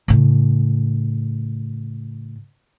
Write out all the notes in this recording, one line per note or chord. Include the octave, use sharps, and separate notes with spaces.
A2 C#3